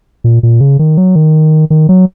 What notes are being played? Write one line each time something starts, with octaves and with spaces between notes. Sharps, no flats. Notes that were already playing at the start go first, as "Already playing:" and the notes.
A#2
A#2
C#3
D#3
F#3
D#3
D#3
F#3